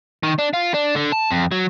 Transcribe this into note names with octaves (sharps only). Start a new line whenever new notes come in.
D#3
D4
F4
D4
D3
A5
F2
F#3